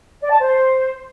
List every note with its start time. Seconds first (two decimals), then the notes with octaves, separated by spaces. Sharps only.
0.20 D5
0.30 A5
0.40 C5